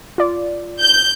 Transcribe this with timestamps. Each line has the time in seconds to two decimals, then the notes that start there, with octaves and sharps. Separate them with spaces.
0.18 F4 D5
0.80 G6